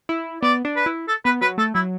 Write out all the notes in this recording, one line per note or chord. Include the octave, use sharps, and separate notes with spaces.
E4
B3 D5
D4
B4
E4
A4
B3 B4
F#3 B4
A3 A4
F#3 E4